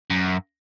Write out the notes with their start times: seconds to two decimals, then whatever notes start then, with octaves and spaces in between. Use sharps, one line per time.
0.10 F#2